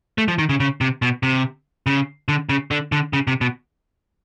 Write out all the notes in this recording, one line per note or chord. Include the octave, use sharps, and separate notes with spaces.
A3
F3
D#3
C#3
C#3
C3
B2
C3
C#3
D3
C#3
D3
D3
C#3
C3
B2